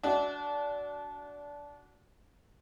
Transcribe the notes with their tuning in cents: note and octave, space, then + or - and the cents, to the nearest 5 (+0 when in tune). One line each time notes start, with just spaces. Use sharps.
D4 -20 F#4 +5 E5 +0